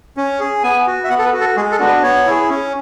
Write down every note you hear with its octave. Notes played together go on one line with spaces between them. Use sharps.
C#4
G#4
B3 G#5
F#4
E5
B3 F#5
A4
B4
F#4
A4
G#3 G#4
A4
B3 D4 F#4
B4
B3 C#5
E4 G#4
C#4